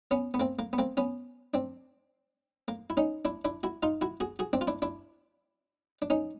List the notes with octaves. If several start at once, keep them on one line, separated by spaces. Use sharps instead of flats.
B3 C#4
B3
A#3 C4
A#3
B3
A#3 C4
B3 C#4
C4 D4
A#3
E4
C#4 D#4
D4 E4
D4 E4
E4 F#4
D#4 F4
E4 F#4
F#4 G#4
F#4 G#4
C4 D4
F4
D4 E4
D4 E4
D4
C#4 D#4